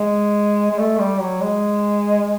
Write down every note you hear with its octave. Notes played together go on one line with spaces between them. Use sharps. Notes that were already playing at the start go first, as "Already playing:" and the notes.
Already playing: G#3
G#3
A3
G3
F#3
G#3